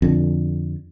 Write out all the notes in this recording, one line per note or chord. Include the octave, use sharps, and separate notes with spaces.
F2 D3